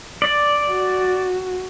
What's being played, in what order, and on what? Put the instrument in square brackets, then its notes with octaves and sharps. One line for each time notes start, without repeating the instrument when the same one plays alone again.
[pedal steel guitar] D5
[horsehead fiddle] F#4